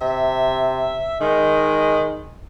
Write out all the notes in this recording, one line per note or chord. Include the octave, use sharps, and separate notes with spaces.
C3 E5
D#3 G#3